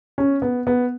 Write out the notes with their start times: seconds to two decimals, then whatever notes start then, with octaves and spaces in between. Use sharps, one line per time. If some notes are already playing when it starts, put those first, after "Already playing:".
0.18 C#4
0.42 B3
0.67 B3